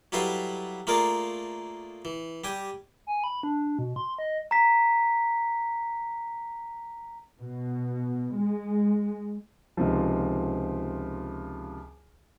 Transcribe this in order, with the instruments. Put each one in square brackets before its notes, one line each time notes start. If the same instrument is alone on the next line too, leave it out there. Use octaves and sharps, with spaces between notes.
[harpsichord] F#3 G3 E4 A4 B4 F5
A3 A#3 F4 G#4 A#4 D5
E3
G3 G4 G#5
[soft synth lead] G#5
B5
D4
B2
C6
D#5
[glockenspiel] A#5 B6
[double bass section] B2
G#3
[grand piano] C#2 C3 D#3 F3